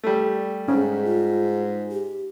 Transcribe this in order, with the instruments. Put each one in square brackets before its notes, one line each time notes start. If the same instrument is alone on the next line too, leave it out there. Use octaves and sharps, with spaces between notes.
[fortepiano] G3 A3
[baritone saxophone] G#2 [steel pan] C#4 [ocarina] G#4
[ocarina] F4
G4